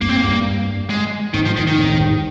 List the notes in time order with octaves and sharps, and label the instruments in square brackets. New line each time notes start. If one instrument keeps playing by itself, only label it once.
[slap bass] G2 [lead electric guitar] A#3
[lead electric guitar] C4
A#3
[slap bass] G2
[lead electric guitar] G#3
[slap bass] G#2 [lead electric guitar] D#3
[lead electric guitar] F3
D#3
D#3
[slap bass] G#2
G#2
G2